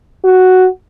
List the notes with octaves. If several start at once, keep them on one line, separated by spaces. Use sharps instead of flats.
F#4